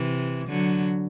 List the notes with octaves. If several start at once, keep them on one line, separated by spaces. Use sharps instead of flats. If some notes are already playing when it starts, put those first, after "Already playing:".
Already playing: C3 E3
D3 F#3